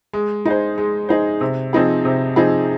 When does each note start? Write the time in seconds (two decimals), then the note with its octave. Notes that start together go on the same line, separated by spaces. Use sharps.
0.13 G#3
0.45 D#4 G#4 C5
0.78 G#3
1.09 D#4 G#4 C5
1.41 C3
1.73 F3 C4 D#4 G#4
2.05 C3
2.36 F3 C4 D#4 G#4